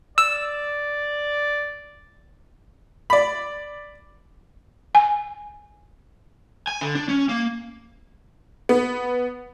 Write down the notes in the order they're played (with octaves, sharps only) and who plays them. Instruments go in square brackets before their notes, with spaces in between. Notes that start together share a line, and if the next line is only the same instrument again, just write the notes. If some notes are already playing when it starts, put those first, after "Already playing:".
[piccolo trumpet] D5 [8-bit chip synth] E6
[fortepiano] D5 B5
[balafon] G#5
[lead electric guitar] G#5
D3
D4
C#4
A#3
[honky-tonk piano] B3